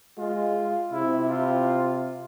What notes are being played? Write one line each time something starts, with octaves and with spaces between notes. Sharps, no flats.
G#3 F4
C3 E4
F4